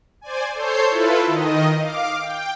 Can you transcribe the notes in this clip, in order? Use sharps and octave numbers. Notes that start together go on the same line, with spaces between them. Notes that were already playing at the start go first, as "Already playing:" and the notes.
C5 D5 G#5
A4 C5 C#5 G6 C7
E4 F4 A4 B4
D#3 D#5
F5 D6
G5